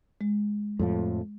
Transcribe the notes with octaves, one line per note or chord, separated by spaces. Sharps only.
G#3
F2 A2 F3